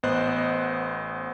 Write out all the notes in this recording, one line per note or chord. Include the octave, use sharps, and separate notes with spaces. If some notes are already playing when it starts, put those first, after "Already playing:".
A1 B3 C5 D#5 F#6